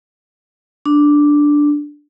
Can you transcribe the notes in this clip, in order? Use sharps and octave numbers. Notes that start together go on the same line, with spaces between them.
D4